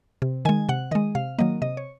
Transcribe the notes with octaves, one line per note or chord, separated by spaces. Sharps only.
C3
D#3 G#3 G#5
C3 F#5
D#3 G#3 D#5
C3 F5
D#3 F#3 A#3 D#5
C3 D#5
C#5